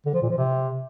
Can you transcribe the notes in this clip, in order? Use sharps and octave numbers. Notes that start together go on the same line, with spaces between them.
D3
F3
A#2
F3
C3